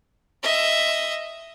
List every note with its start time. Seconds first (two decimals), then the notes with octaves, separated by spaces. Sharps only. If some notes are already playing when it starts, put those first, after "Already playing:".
0.43 D#5 E5